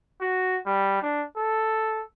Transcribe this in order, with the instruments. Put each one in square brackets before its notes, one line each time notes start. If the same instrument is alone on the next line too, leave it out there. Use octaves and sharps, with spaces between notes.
[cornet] F#4
G3
D4
A4